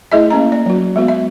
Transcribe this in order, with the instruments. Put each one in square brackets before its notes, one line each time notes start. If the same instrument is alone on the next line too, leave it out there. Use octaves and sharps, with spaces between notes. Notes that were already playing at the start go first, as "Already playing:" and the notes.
[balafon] A3 E4 G#4 D#5 E5
A#3 C#4 A#5
D5
F#3 F#4
G#3 B3 F#4
E5